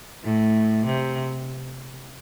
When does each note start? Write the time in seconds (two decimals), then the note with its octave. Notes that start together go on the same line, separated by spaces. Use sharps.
0.24 A2
0.87 C3